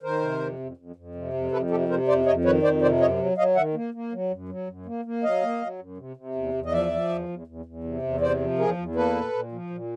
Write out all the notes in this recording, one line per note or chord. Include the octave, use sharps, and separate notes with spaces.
D#3 A#4 C5
C3
F2
F2
F2
F2
C3
F2
F2 A4 B4
C3 G4 A4
C3 A#4 C5
F2 C5 D5
F2 C#5 D#5
D#3 B4 C#5
F2 C5 D5
C3 C5 D5
F#2 C#5 D#5
F#3
F#3 D#5 F5
D#3 E5 F#5
A#3
A#3
F#3
F#2
F#3
F#2
A#3
A#3
F#3 D#5 F5
A#3
F#3
F#2
C3
C3
E2
E2
D#5
F3 D5 E5
F3
E2
E2
E2
E2
C3
E2
C3 C5 D5
F3
E2 G#4 A#4
E2
A#3 A4 B4
A#2
A#2
F3
A#2